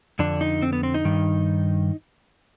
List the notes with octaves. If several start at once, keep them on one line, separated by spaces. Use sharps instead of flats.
F2 D3 D4
D#4
C4
B3
C4
D#4
G2 D#3